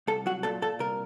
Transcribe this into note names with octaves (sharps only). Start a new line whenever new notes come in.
C2 A4
F#3 F#4
A#2 A4
A#2 A4
C2 A#4